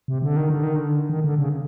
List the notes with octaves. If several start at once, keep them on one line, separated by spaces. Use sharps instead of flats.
C3
D3
D#3
D3
D#3
D3
D#3
D3
C#3